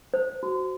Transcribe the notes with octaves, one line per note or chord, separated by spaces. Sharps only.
C5
F#4